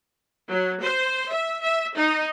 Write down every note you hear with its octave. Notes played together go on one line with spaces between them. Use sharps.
F#3
C5
E5
E5
D#4